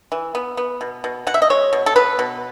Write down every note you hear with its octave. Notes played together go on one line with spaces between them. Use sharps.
E3
B3
B3
B2
B2
B2 F#5
E5
D#5
G#3 C#5
B2
A4
B3 B4
B2